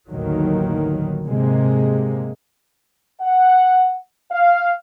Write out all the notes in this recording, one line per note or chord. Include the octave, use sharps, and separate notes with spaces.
A1 D#2 A2 D3 D#3 F#3
G#2 C3 G#3 A#3
F#5
F5